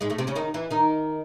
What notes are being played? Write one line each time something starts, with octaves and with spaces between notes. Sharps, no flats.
G#2 G#3
A2 A3
C3 C4
C#3 C#4
D#3 D#4
E3 E4
D#3 D#4